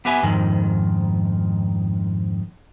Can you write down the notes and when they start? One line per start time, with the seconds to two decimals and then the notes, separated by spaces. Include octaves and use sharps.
0.05 B3 G4 B4 E5 G#5
0.23 F2 G#2 D#3